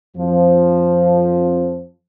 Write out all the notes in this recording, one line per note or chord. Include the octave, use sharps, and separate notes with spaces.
F2 F3